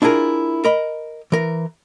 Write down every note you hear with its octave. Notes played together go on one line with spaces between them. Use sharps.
D4 E4 F4 G#4 A#4
A#4 D#5 B5
E3 A#4